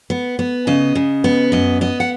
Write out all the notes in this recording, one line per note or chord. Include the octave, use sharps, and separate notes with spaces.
B3
B3
C#3 D#5
C#3
B3
F#2 D#5
B3 D#5
F#5